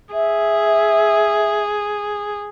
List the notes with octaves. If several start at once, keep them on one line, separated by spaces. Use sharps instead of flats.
G#4 E5